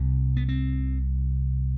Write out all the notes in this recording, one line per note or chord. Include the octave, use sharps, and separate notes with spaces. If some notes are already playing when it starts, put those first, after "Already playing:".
Already playing: C2 C3
B3
C4